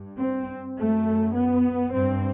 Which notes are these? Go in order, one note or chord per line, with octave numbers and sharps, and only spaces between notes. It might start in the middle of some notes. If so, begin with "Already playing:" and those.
Already playing: G2
C4
F#2 A3
B3
G2 C4